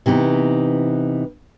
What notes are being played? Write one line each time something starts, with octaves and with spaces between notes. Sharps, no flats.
C3 E3 B3 D#4